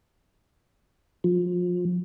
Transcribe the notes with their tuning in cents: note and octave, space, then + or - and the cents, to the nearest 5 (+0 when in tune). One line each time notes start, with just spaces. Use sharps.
F3 +30